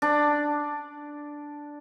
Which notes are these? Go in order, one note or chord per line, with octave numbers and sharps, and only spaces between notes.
D4